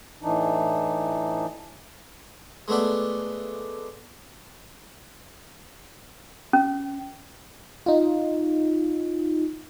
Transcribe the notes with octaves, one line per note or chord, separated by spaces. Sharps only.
A2 E3 D4 D#4
G#3 A3 B3 D4 D5
C#4
D#4 F4